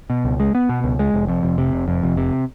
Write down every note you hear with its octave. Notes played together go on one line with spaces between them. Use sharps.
B2
C#2
G#3
B3
B2
C#2
G#3
F1
F2
F1
C3
F1
F2
F1
C3